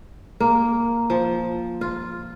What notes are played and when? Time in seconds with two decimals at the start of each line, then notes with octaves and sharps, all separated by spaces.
0.40 A#3
1.10 F3
1.81 F4